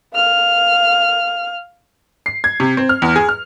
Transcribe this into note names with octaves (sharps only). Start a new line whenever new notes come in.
F5 F6
C7
G#6
C3
C4
F6
E2
G#4
F6